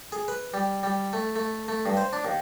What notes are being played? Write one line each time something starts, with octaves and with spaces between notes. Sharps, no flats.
G#4
B4
G3
G3
A3
A3
A3
G2
C5
D4
D#2